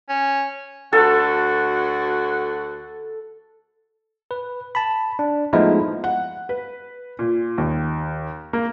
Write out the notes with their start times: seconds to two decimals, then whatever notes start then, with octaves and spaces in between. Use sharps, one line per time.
0.09 C#4
0.93 D2 F#4 A4
4.31 B4
4.75 A5 B5
5.19 D4
5.53 F3 G#3 A3 B3 D#4 E4
6.04 F#5
6.49 B4
7.19 A#2
7.58 D#2
8.53 A#3